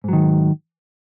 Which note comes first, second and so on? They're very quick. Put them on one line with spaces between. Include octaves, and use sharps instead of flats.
G#2 F#3 D#3